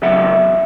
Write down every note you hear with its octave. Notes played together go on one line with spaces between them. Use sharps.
E2 C#3 F#3 E5 F#5